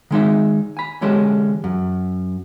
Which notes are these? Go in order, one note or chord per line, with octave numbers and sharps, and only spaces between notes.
D#3 G#3 D#4 E5
G#5 B5
D3 E3 G#3 C#4 G4 A4
F#2